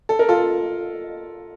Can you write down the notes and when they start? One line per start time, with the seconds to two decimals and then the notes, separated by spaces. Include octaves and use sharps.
0.09 A4
0.19 A#4
0.29 F4 A4